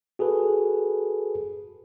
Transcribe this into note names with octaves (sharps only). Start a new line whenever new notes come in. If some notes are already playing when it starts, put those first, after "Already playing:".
F#4 G#4 A4 B4